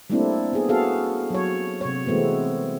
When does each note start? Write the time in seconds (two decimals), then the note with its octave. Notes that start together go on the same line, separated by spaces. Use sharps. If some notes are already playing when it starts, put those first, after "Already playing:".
0.10 G3 A3 A#3 C4 D4 E4
0.53 B3 G#4
0.69 B3 F#4 G#4 A4 F5
1.30 F#3 C#5
1.81 C3 C#5
2.06 E3 G#3 A3 B3 C4